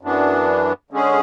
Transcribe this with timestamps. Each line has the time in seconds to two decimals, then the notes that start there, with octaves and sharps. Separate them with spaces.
0.01 F#2 E3 B3 D4
0.90 D3 G#3 C#4 G#4